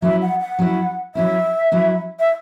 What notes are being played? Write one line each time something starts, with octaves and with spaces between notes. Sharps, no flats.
F#3 C#4 E4 E5
F#5
F#5
F#3 C#4 E4
F#3 C#4 E4 E5
F#3 C#4 E4
E5